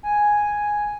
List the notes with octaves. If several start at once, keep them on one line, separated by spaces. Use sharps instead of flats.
G#5